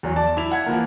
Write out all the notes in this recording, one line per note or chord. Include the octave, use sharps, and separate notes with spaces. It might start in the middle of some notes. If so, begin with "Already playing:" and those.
E2 F#3
D5 A5
E4 F7
F#5 G#6
E3 F3 A#3